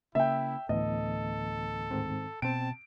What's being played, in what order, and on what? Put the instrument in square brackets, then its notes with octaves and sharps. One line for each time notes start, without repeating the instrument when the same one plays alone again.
[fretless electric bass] C#3 A#3 [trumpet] E4 [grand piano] E5 G5
[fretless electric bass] D2 A2 [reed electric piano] E3 B3 [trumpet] A4 [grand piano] D#5
[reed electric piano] G#2 D#3 C4
[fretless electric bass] B2 [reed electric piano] C4 G5 [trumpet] A5 [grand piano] D7